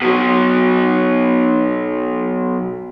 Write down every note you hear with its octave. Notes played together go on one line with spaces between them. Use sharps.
B2 F#3